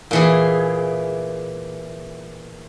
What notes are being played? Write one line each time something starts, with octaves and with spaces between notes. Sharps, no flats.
A#2 E3 G#4